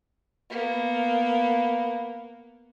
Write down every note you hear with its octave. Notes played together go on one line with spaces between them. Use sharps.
A#3 B3